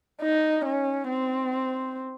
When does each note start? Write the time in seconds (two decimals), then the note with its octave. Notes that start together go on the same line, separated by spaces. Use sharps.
0.22 D#4
0.65 C#4
1.09 C4